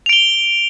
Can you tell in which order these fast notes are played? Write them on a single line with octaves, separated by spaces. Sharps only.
F7 D7 G7